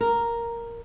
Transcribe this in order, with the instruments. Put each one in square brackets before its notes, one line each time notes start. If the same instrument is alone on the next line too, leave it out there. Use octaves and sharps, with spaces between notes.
[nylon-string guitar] A#4